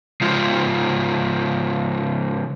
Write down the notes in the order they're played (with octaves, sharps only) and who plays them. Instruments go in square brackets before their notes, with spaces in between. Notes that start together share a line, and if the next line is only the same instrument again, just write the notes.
[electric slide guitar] C#3 F3 G#3